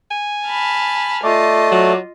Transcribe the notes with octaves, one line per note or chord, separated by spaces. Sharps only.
G#5
A5 B5 F6
A3 F4 D5 D#5
F#3